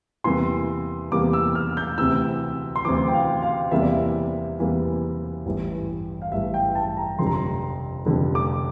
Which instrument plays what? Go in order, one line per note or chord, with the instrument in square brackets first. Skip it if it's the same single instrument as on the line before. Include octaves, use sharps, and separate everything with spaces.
[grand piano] E2 C3 E3 G3 A#3 C6
E2 C3 E3 G3 A#3 D6
E6
F6
G6
D2 C3 E3 E6
C6
D2 C3 E3 D6
G5
F5
F5
E2 C3 E3 G3 A#3 E5
D5
E5
E2 C3 E3 G3 A#3
A1 G2 E3
F5
A1 G2 E3 E5
G5
A5
A#5
F1 F2 D3 G3 C6
A#5
C6
F1 F2 D3 G3
D6